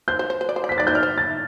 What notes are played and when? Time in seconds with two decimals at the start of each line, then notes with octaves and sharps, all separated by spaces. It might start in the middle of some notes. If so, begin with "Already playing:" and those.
0.08 C5 G6
0.19 C5
0.30 C5
0.41 C5
0.49 D5
0.56 C5
0.64 D5
0.69 C5 B6
0.78 D5 A6
0.87 C5 G6
0.95 D5 F6
1.03 C5
1.18 A6